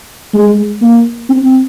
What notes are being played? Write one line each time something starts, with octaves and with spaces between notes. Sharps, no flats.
G#3
A#3
C4